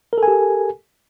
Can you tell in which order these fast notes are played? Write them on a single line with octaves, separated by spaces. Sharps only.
A#4 A4 G#5 G4